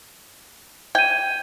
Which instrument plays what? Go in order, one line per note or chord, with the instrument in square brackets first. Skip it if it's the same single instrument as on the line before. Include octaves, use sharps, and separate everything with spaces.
[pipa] G5 [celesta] G#6 D#7